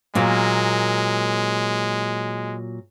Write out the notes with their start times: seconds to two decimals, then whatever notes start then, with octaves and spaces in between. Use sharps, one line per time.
0.15 A#2 F#3 G#3 A#3